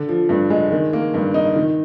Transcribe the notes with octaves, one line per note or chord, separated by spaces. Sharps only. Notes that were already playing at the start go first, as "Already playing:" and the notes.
Already playing: D3
F3
G2
G#3
D#3
A#3
G2
D#4
D#3